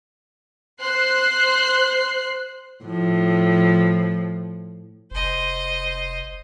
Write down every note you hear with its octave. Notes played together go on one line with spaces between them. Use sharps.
C5 F#6 C7
A2 F3
F1 C5 D#5